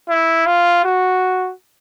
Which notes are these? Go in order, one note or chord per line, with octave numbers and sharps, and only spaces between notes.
E4
F4
F#4